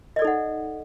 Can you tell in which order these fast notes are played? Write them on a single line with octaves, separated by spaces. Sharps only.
D#5 D5 A4 D#4 F#5